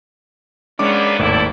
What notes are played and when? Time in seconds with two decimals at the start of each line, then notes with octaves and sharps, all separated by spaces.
0.79 D#2 G#3 A#3 B3 C#4 D4 D6
1.19 G#1 D#2 A2 E4 A4 D5